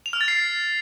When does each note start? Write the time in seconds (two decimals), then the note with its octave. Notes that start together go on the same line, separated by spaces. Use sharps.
0.06 F7
0.13 F6
0.21 A6
0.28 C7